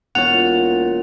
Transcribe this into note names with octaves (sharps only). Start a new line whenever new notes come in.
E1 A#2 C#5 F#5 F7